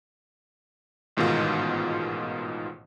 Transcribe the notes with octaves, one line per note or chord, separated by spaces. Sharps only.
A1 G#2 B2 D#3 F4